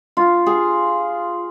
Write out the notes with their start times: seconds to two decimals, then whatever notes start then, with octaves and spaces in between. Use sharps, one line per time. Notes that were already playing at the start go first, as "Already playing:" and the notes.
0.17 F4
0.46 G#4